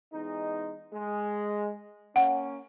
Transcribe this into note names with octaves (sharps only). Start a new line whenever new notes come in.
E2 G#3 D#4
G#3
A#3 C#4 F#5